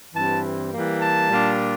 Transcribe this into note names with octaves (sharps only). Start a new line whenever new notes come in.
G2 E3 G3 C4 E4 A5
E3 G3 A#3
A5
A#2 G3 D4 F4